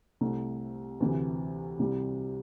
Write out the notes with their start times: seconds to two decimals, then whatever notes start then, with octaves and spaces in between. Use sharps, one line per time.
0.21 C2 C3 A3
1.00 D2 C3 E3
1.79 C2 C3 G3